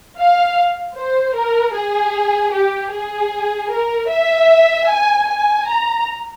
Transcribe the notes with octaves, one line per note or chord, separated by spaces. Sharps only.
F5
C5
A#4
G#4
G4
G#4
A#4
E5
G#5
G#5
A#5